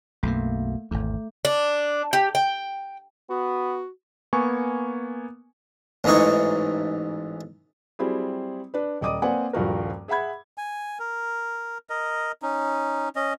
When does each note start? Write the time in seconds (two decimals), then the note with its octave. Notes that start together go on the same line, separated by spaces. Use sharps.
0.23 B1 F#2 B2 A3 A#3
0.91 G#1 E2 A3
1.45 D4
2.13 G4
2.35 G5
3.30 B3 F#4
4.33 A#3 B3 G#5 C#6
6.04 A1 G#2 E3 D#4 C#6
7.99 F#3 G3 C4 E4 G#4
8.74 D4 B4
9.01 D#1 D5 D#5 D6 D#6 D#7
9.22 A#3 C4 B4 D5 F#5 G#5
9.53 D#1 G2 F3 F#4 A#4
10.08 G#4 E5 F#5 B5 G#6
10.58 G#5
10.99 A#4
11.90 A#4 D#5
12.42 C#4 D#4
13.16 C#4 D#5